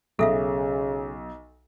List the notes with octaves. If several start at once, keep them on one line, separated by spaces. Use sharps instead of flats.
B1 C#3 A4 E5 F5